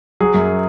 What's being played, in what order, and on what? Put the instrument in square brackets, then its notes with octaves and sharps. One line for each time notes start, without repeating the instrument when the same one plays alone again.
[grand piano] F#3 G#4
F#2